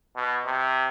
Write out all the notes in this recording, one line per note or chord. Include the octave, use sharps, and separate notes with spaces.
B2
C3